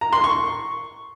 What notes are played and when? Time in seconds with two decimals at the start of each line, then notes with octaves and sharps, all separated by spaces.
0.01 A#5
0.13 C6
0.24 C#6